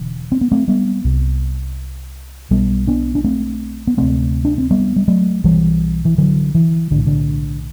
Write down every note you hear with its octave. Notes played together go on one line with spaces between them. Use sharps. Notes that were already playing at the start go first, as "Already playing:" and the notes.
Already playing: E1 E2 D3
C4
B3
A3 C4
G3 B3
C2 C3
B1 B2 G3 B3
B3 D4
D4
A3 C4
B3
D2 C3 A3 C4
D4
C4
G3 B3
G3
F#3 A3
B1 B2 E3 G3
E3
D3 F#3
E3
B1 A2 D3
D3